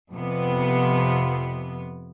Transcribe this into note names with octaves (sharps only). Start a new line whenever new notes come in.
F2 C3 B3